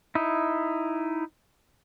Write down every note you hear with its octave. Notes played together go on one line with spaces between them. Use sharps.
D#4 E4